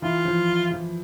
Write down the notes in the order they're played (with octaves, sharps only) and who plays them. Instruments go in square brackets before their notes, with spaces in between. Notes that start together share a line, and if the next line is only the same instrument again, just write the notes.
[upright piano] E3 [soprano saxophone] F4
[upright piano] F3
F3